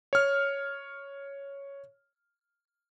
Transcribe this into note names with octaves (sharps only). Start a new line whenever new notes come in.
C#5 F6